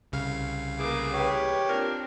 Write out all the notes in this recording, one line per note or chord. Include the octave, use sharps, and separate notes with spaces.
C2 C#3 F5
E3 A3 A#3 G#4 D6
G4 B4 C#5
A#2 C4 D4 A#4